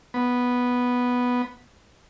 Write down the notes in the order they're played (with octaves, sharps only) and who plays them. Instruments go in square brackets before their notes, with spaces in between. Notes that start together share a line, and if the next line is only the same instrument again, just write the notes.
[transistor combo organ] B3